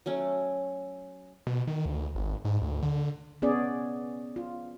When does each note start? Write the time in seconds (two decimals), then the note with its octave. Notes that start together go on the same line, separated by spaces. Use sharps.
0.06 F#3 A3 C#4
1.47 B2
1.67 D#3
1.86 D2
2.15 G#1
2.45 G#2
2.62 D2
2.83 D3
3.42 B3 C#4 G#4 D5
4.36 F4